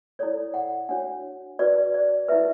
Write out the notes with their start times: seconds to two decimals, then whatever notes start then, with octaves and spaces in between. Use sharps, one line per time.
0.19 E4 A4 C#5 D5
0.54 F#5
0.89 D4 F#4 C#5 F#5
1.59 F#4 B4 D5
1.94 D5
2.28 E4 B4 E5